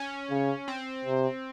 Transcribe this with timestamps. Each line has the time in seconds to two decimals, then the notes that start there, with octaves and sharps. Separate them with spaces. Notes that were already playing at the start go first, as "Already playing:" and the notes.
Already playing: C#4
0.30 C#3
0.68 C4
1.05 C3